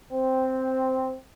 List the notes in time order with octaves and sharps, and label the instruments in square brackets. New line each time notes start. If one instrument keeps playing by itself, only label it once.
[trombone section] C4